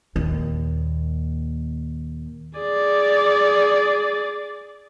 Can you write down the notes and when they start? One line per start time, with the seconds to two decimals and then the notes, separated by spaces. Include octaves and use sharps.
0.16 D#2 A#2
2.59 G#4 D5